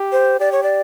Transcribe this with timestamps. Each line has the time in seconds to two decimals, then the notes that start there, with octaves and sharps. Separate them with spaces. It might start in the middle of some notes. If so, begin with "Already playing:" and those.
Already playing: G4
0.12 C5
0.40 G4 D5
0.52 C#5
0.63 D5